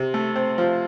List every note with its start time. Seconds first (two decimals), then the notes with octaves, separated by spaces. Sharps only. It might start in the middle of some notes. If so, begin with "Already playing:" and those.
Already playing: C3
0.14 A3
0.36 C4
0.58 F3